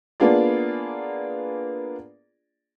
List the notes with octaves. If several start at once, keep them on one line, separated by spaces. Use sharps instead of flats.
A#3 B3 D4 F4 G#4 D5